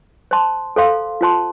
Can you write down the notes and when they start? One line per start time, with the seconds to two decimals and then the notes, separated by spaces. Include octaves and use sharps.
0.31 C5 A5 C6
0.76 A4 C5 F5 C6
1.21 F4 C5 A5 C6